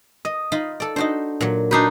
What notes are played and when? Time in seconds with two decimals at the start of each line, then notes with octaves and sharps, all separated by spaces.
0.25 D#5 D#6
0.52 D#4 F4 B5
0.80 A4 D5
0.96 D4 D#4 F#4 C5
1.41 A#2 F#3
1.71 D4 D#4 F#4 B4 G6 C7